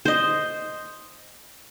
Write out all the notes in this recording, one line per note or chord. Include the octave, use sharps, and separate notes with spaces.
C5 D#5